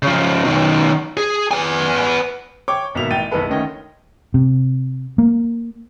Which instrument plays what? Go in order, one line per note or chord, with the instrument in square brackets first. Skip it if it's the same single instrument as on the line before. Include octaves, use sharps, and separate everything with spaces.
[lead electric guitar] C#3 F3
B2 D#3
G#4
B3 G#5
[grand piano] C#5 G5 C#6 D6
G#1 B2 A#3 E5 F7
A1 G5 A6 D#7
F#1 B1 B3 E4 A4 B4
D2 D#3 C#4 D#5 G5
[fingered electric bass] C3
A#3